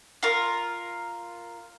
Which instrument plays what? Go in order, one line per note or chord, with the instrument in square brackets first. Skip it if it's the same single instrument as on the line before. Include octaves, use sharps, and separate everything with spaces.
[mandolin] F4 A#4